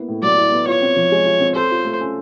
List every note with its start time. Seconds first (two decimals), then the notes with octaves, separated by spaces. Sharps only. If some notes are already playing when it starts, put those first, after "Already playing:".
Already playing: A#3 B3 E4
0.08 A2
0.22 F#3 D5
0.37 E4
0.52 B3
0.67 F4 C#5
0.82 C4
0.96 F3
1.12 G#3
1.26 F4
1.41 C4
1.55 A4 C5
1.71 F4
1.85 A3
2.01 C#4